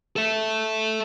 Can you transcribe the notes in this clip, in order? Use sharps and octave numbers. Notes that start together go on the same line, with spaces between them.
A4 E5